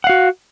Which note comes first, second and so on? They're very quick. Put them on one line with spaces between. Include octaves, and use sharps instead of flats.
F#5 F5 F#4